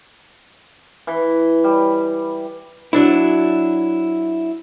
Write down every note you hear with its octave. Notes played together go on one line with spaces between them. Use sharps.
E3
G3
F#3 D4 E4